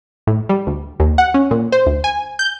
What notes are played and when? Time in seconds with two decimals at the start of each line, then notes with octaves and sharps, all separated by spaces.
0.27 A2
0.49 G3
0.67 D2
1.00 D#2
1.18 F#5
1.34 C#4
1.51 A#2
1.72 C5
1.86 D2
2.04 G#5
2.39 G6